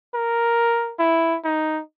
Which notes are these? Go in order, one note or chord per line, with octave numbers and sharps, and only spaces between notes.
A#4
E4
D#4